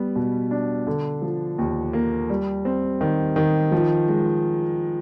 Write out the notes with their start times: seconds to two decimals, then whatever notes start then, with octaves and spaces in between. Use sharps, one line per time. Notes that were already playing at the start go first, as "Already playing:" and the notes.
Already playing: G3 B3
0.16 B2
0.51 D4
0.87 D3
1.22 F3
1.58 D#2
1.93 A#3
2.29 G3
2.65 C4
3.01 D#3
3.36 D#3
3.72 F3
4.08 G#3